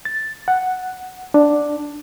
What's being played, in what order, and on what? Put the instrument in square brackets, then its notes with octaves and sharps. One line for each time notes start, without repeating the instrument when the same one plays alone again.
[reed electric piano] A6
F#5
D4